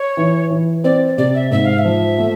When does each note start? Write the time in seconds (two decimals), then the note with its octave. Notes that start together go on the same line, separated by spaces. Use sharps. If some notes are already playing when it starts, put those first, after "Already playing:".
Already playing: C#5
0.17 E3
0.51 E3
0.84 C4 D5
1.18 C3 D5
1.35 E5
1.51 G#2 E5
1.65 F5
1.78 E5
1.85 F3
2.18 A3